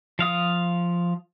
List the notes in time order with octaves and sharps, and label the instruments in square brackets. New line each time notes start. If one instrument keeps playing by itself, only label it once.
[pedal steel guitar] F3 F5 D#6